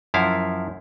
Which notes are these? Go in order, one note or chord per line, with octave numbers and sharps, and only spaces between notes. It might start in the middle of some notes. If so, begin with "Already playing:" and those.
F#2 F3 E4 F5